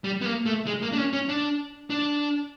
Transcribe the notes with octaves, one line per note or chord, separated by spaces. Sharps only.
G3
B3
A#3
A3
G#3
A#3
D4
C#4
C#4
D4
D4